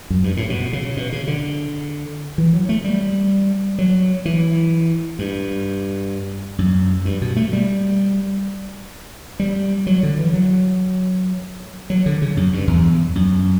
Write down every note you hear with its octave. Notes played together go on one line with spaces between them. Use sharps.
F#2
G2
A2
B2
C#3
B2
C#3
D3
E3
F#3
A3
G3
F#3
E3
G2
F#2
G2
B2
A3
G3
G3
F#3
D3
E3
F#3
F#3
D3
C#3
F#2
G2
E2
F#2